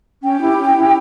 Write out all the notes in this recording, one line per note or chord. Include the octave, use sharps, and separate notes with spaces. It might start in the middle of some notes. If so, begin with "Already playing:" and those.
C#4 G5
E4 G4
C#4
E4 G4